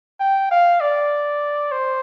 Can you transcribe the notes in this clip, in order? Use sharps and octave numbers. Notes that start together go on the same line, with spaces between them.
G5
F5
D5
C5